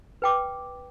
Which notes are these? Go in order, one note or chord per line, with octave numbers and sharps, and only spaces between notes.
B4 G5 D6